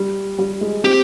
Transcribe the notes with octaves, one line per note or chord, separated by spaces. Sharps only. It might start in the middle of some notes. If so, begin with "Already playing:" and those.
Already playing: G3
G3
G#3
C4 G4